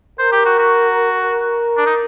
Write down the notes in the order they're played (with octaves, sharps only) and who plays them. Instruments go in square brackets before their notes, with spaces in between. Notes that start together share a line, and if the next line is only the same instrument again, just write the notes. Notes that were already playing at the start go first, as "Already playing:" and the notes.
[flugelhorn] A#4 [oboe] C5
[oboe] G4
F#4
F#4
[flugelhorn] A#4
[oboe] D4
D#4